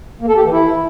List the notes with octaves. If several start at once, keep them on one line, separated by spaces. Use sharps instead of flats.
A#3
A4
G4
E3
E4